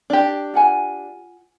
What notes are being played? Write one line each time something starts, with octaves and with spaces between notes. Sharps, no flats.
D4 G4
F4 F#5 G#5